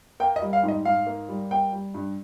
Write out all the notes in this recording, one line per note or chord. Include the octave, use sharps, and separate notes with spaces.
A#3 G5
D#5
G3
F5
G#2
D#5
G#2 F5
A#3
G3
A#3 G5
G3
G2